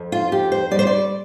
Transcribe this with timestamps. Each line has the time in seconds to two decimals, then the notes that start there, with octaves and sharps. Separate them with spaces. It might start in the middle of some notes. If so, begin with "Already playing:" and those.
Already playing: F2
0.12 F4
0.32 F2 G4
0.52 C5
0.71 G3 D5
0.79 C5
0.87 D5